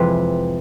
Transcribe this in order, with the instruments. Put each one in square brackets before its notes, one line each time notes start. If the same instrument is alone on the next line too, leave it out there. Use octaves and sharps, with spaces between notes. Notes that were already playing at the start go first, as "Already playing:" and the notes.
Already playing: [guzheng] F2 C3 E3 G#3 C4 B4